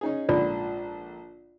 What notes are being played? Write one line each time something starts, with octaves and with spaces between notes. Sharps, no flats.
C#4 D#4 G#4
A#1 G#2 D3 F4 D5